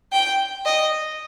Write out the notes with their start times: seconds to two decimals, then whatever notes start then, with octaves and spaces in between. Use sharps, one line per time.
0.13 G5
0.66 D#5